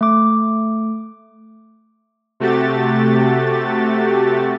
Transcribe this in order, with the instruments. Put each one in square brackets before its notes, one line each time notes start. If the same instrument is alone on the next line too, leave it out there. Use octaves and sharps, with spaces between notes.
[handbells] A3 D6
[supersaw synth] C3 A3 F#4 G4 A6